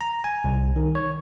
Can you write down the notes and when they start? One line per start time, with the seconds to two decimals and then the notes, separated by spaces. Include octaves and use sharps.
0.01 A#5
0.24 G#5
0.44 C2
0.76 D#3
0.95 C#5